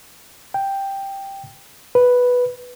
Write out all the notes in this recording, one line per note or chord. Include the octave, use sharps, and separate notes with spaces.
G5
B4